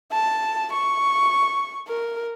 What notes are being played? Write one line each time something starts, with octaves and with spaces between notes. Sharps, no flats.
A5
C#6
A#4